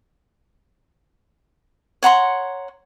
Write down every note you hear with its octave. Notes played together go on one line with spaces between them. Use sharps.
C#5 F#5 A#5 C6